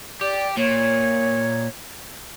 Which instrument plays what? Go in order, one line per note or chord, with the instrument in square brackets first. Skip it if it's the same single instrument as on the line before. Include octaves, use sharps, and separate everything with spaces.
[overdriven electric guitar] G4 [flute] D5
[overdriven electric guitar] A#2 [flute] C#5